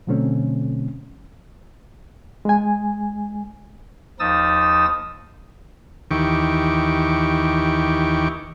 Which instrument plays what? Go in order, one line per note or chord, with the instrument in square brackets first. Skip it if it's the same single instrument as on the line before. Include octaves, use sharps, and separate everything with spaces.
[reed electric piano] B2 D3 F#3 A3 C4 C#4
G#3 G#5
[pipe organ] D#2 F3 D#4 D#6 E6 A6
[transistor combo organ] D#2 D#3 E3 G4 C#6 D6